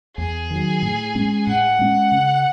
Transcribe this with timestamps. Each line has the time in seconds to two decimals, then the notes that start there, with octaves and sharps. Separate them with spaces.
0.17 E2 G#4
0.50 D#3 F#3
0.82 A2
1.15 G#3 C#4
1.47 A2 F#5
1.79 G#3 C#4
2.12 C#3